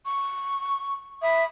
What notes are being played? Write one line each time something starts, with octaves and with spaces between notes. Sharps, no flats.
C#6
E5 B5 D#6